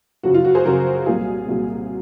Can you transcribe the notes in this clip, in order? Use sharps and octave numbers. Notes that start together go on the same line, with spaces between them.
F#2 C#3 F3 F#4
F4
F#4
G#4 C5
F#2 C#3 F3 F#4 A#4
C2 A#2 F#3 F4 G#4
C2 A#2 F#3